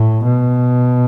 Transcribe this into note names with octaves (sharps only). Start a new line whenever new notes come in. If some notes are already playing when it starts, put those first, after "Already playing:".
Already playing: A2
B2